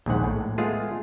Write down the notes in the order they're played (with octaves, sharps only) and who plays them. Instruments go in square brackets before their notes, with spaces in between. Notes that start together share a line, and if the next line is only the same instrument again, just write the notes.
[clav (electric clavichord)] A#1 D#2 G#2 F#5
A2
G#3 A3 B3 F4 G#4 F5